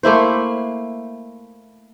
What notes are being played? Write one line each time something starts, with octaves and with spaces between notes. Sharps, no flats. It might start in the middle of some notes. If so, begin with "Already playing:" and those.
A3 A#3 E4 C5